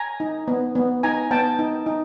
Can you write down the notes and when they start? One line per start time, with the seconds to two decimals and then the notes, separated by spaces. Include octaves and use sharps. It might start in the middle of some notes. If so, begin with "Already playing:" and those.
Already playing: G#5 A#5
0.20 D#4
0.48 B3
0.75 B3
1.03 D#4 G#5 A#5
1.31 B3 G5 A5
1.59 D#4
1.86 D#4